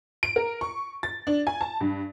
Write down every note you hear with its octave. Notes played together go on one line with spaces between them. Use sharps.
D7
A#4
C#6
A6
D4
G#5
A5
G2